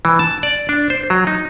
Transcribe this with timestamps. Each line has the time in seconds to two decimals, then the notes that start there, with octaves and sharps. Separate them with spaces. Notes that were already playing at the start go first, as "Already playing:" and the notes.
0.05 E3
0.19 A5
0.43 D5
0.69 D4
0.90 C5
1.10 F#3
1.27 D#4